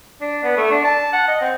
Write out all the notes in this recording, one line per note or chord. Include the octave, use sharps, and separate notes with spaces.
D4
B3
A3
D4
A5
F#5
D#5
C4